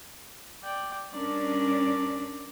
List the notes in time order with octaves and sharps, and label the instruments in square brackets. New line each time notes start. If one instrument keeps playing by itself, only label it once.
[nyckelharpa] D5 G5
[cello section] G2 C#4 D4 [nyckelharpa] A#4 D5